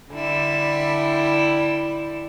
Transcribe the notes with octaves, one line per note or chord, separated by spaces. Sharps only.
D3 G3 E4